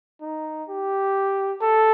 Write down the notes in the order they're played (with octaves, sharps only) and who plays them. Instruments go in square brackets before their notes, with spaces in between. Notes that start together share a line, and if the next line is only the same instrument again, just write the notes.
[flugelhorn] D#4
G4
A4